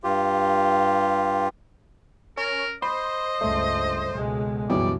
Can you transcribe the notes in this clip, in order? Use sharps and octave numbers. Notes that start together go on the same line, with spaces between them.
G2 F4 G4
C#4 A#4
C5 D#5 B5
C#2 G2 A3
C#2 B2 G#3
C#2 F#2 B2 E3 F#3 G3 D5